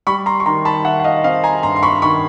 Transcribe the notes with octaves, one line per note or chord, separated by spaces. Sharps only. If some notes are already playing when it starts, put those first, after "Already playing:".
G3 B5 C#6
A#5 C6
C#6
D#3 A#5 C6
A5 B5
D#3 E5 F#5
F#5
D#5 F5
C4 D#5 F5
G#5 A#5
G2 A#5 C6
C6
B5 C#6
D#3 B5 C#6